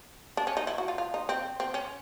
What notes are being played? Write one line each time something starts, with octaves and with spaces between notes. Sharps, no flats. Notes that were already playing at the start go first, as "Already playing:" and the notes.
D4
C#4
D#4
E4
F#4
F4
F4
D#4
C4
C4
C#4